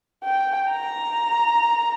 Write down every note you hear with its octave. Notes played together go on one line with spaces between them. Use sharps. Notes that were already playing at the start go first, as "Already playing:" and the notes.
G5
A#5